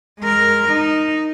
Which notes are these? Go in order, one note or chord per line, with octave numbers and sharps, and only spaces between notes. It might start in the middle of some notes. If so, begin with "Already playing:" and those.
G#3 A#4
D#4